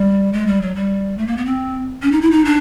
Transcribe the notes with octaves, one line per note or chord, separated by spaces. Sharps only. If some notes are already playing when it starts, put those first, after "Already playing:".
Already playing: G3
G#3
G3
F#3
G3
A3
A#3
B3
C4
C#4
D#4
E4
D#4
D4